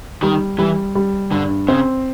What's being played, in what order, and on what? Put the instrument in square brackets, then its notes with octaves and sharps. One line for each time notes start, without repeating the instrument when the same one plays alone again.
[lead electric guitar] D#3 [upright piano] G3
[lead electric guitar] E3 [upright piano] G3
[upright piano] G3
[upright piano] G2 [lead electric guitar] D3
[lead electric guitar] C#3 [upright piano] C4